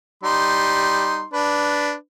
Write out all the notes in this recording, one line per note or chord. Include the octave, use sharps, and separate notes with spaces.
G3 D#4 C6
D4 B4